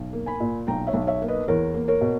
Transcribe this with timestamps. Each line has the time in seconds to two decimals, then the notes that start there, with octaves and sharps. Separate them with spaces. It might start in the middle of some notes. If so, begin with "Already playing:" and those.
Already playing: B1
0.13 A#3
0.26 G#5 B5
0.40 A#2
0.67 B1 G5 A#5
0.87 C#5 E5
0.94 B1
1.07 C#5 E5
1.22 A#3
1.28 B4 D#5
1.48 E2 A#4 C#5
1.74 A#3
1.88 A#4 C#5
2.01 B2